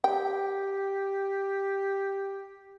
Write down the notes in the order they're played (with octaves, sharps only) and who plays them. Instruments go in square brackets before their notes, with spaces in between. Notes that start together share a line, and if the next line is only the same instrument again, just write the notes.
[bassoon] G4 [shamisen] G5